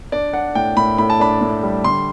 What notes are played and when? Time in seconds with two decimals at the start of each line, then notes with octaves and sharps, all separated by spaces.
0.12 D4 D5
0.33 D4 F#5
0.55 A2 G5
0.76 A2 B5
0.98 A2 B5
1.10 A5
1.20 D4 B5
1.41 A2
1.63 G3
1.84 D3 C6